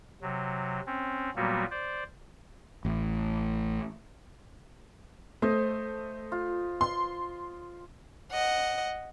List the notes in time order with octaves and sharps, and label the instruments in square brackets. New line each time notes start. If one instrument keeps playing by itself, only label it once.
[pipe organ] C3 F#3
C4 C#4
A#2 F#3 G3 A#3 B3 F#4
C5 D5
[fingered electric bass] A1 A2
[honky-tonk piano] A3 [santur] C5 D#5
[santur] F4
[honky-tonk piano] C6
[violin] D#5 F#5